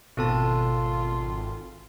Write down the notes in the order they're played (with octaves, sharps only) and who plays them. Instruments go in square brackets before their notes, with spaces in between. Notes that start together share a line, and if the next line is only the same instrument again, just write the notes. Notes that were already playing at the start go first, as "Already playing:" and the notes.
[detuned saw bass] G#1 [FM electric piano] B2 [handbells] C4 A4 A5 [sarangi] F4